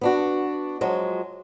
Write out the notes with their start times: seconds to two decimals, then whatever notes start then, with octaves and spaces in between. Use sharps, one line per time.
0.01 B3 D4 F#4
0.81 F3 F#3 G#3